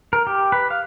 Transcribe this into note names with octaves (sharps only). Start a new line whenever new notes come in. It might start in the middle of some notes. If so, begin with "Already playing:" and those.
A#4
G4
B4
F5